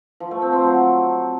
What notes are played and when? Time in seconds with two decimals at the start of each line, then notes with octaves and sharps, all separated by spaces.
0.20 F3
0.31 A3
0.42 C4
0.53 C4
0.64 F#3